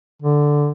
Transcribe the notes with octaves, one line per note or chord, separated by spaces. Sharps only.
D3